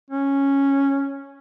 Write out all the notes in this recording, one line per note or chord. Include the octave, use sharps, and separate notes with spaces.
C#4